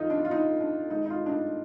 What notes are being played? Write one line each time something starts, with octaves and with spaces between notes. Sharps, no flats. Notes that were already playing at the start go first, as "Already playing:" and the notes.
Already playing: F2 D#3 D#4 F4
D4
F4
D#4
D4
G#2 D#3 D#4
D#4
F4
D4
D#4